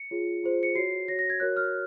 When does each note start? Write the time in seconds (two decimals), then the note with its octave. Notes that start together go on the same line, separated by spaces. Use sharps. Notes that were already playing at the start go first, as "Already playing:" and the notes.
Already playing: C#7
0.11 F4 G#4 C#5
0.43 F4 G#4 C5
0.63 C#7
0.75 F#4 C#5 C7
1.08 F#4 C#5 A#6
1.19 A#6
1.30 G#6
1.40 F#4 A#4 C#5 F#6
1.57 F6